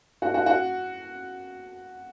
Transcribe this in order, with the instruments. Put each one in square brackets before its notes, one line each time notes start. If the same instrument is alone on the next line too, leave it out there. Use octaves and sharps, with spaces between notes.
[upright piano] F#4
F#4
F#4